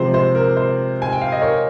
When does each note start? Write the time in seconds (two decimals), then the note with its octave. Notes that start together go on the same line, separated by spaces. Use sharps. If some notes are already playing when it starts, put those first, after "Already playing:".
Already playing: C3 F3 G#3 C5
0.14 C5
0.35 A#4
0.57 C5
1.02 G#5
1.12 G5
1.21 F5
1.32 D#5
1.42 A#4 C#5